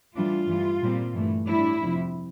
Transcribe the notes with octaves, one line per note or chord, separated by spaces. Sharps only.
A2 E3 G3 D4 F4
G2 E3 G3
A#2 G3 C4
G2 E3 A3
A2 G3 D4 E4
F2 C3 F3